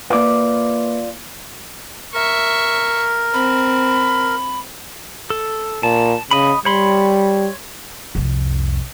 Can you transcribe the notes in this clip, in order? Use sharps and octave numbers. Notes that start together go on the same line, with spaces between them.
A#3 F4 B4 D5
A#4 E5 C#6
C4 B5
A4
A#2 A5
C#3 D#5 B5
G3 C#5 B5 C6
C2 F2